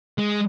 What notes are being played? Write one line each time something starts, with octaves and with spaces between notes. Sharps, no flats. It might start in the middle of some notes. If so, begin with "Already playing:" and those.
G#3